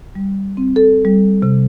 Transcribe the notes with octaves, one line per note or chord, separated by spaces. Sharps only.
G3
C4
A4
G3
C3